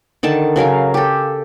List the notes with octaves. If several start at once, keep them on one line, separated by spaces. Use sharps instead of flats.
D3 D#3 A5
C#3 F#3 A#4 F5
G4 A4